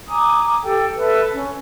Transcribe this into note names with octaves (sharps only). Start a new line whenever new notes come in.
G#5 A#5 D6 D#6
G4 A4 G5
A4 B4 E5
C#4